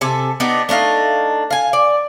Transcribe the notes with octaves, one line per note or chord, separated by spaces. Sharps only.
C3 A4 G#5
B3 D4 D#4 G4
A3 D4 D#4 F5
F5 G#5
D5